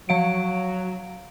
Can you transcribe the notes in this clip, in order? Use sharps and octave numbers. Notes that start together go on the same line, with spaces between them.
F3 F#3 F5 D7